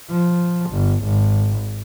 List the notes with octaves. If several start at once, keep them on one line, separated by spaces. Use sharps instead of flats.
F3
G1
G#1